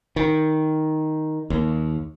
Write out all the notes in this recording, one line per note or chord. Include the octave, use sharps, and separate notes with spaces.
D#3
D#2